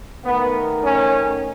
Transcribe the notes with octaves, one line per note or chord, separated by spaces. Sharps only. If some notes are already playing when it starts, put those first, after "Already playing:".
D#3 A3 B3
C#4